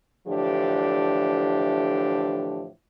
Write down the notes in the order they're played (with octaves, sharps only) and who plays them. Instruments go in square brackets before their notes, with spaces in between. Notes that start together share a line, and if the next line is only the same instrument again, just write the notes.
[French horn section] A2 D3 E3 F3 D4 G4